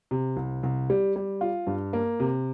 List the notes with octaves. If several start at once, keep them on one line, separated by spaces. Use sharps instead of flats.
C3
C2
C2
G3
G3
F4
G2
A#3
C3